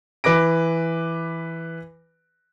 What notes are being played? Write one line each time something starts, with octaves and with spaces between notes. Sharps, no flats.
E3 B4 D6 A#6 D7